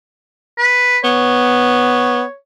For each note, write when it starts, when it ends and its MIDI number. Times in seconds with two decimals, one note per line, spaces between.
0.58 0.98 71
1.04 2.23 59
1.04 2.35 73